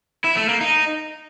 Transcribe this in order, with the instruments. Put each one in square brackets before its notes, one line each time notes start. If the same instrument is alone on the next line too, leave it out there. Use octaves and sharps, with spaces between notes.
[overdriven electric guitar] E4
A3
A#3
D#4